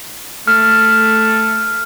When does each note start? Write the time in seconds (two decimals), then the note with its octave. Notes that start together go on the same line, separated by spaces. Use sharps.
0.47 A3 F6